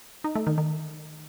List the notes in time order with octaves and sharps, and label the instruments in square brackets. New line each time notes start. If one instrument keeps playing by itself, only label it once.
[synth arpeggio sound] D#4
A3
D#3
D#3